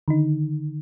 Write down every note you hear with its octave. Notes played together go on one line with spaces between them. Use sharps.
D3 D#3 D#4